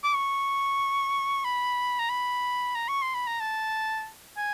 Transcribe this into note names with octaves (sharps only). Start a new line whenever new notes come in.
D6
C#6
B5
A#5
B5
A#5
C#6
C6
B5
A#5
A5
G#5